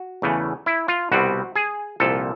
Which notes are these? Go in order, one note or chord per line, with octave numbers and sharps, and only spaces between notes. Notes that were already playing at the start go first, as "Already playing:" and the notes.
Already playing: F#4
E2 C#3 E3 A3
E4
F4
C2 B2 G3 C4 F#4
G#4
C2 A#2 F3 A4